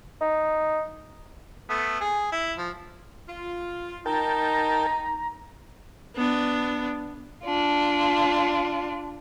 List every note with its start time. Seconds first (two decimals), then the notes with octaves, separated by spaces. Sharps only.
0.21 D#4
1.69 A3 B3
2.01 G#4
2.32 E4
2.57 F3
3.28 F4
4.06 D#4 A#4 G5 A5 A#5
6.16 B3 D4
7.44 D4 F4